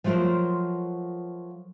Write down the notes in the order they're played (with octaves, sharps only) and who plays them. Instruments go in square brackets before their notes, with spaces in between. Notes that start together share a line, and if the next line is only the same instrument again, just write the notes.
[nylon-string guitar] F3 F#3 A3 F4 A#4 C5